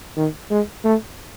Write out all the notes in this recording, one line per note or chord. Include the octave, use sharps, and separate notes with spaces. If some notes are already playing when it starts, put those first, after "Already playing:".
D#3
G#3
A3